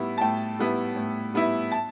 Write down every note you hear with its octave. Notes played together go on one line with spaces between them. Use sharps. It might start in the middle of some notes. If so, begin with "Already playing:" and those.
Already playing: A2 G3 B3 E4
A5
A2 G5
G3 B3 E4
A2
G3 B3 E4
A5